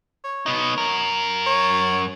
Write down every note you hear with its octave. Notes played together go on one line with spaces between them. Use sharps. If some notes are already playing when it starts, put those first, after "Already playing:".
C#5
B3 D#4
F#2 A#4
C#5